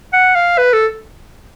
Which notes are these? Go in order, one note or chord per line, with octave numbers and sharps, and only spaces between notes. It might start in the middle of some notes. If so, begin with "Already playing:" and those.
F#5
F5
B4
A4